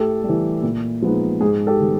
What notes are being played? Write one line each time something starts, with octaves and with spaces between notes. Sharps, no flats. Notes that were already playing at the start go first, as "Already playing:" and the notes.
Already playing: A2 G4 A4
G3
E3
A#2
F3 G#3 B3 D#4
G#2 G#4
G4 A4
D#3 G3 B3